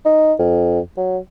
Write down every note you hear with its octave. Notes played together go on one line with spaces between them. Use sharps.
D#4
F2
F#3